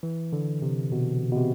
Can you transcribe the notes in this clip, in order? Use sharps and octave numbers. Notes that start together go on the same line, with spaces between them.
E3
D3
C3
B2
B2
C3